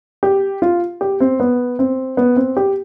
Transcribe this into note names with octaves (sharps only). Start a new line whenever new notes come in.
G4
F4
G4
C4
B3
C4
B3
C4
G4